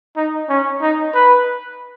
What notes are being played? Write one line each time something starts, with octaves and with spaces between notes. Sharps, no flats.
D#4
C#4
D#4
B4